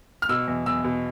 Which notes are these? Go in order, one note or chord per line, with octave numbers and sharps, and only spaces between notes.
F6
B2 E6
E2
E2 E6
B2